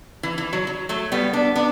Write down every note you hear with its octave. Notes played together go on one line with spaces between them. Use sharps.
E3
E3
F#3
F#3
F#3 A3
G3 B3
B3 D4
B3 D4